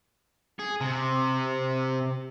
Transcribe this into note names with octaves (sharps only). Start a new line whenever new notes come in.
G#4
C3